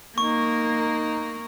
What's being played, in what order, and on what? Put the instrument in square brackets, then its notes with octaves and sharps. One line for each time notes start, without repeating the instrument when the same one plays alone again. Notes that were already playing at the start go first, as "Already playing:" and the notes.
[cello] A#3 [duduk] D#4 [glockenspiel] C#6